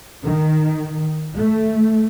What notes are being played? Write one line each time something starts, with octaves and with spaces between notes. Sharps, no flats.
D#3
A3